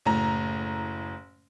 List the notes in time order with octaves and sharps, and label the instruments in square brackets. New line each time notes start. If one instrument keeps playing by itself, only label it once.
[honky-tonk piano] F#1 A2 A#5